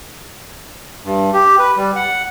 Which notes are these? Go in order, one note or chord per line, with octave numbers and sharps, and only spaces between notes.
G2
G4
B4
G3
F#5